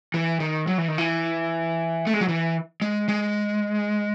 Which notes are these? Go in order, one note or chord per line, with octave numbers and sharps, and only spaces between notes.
E3
D#3
F#3
E3
D#3
E3
A3
G#3
F#3
E3
G#3
G#3